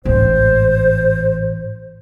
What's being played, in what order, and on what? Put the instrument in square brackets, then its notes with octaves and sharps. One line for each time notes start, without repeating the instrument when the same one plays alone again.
[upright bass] A1 G#2 [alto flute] C5